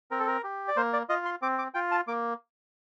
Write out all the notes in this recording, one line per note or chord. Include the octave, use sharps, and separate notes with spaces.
C4 A#4
A4
A#4
G4
D5
A#3 C5
D5
F4 D#5
C6
C4 D6
D6
F4 G5
A5
A#3 D6